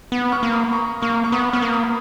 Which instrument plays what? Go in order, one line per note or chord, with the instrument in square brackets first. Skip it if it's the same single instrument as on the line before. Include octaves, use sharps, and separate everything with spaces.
[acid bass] B3
[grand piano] C#6 F6
[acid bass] A#3
[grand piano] B5 D#6
A#5 C#6
[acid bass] A#3 [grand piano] C#6 F6
[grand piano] C#6
[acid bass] B3 [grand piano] B5 D#6
[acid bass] B3 [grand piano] C#6 F6
[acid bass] A#3
[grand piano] B5 D#6